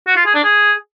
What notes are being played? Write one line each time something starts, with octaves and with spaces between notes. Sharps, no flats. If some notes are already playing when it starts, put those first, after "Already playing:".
F#4
F4
G#4
D4
G#4